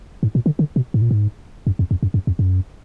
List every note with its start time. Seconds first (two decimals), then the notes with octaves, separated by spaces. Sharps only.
0.23 G#2
0.35 A#2
0.46 D3
0.59 D3
0.76 B2
0.94 G#2
1.02 A#2
1.11 G#2
1.67 F#2
1.79 F2
1.91 F2
2.03 F#2
2.14 F#2
2.27 F2
2.39 F#2